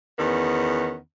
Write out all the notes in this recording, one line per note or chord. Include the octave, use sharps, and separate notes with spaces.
E2 D#3 B3 C#4